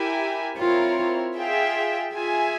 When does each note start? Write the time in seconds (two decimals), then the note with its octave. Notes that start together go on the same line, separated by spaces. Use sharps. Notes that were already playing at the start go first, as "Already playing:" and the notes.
Already playing: E4 G4 A#4 E5 G#5
0.57 C4 E4 F4 A#4 C#5
1.36 F4 G#4 E5 G5
2.12 F4 G#4 E5 G#5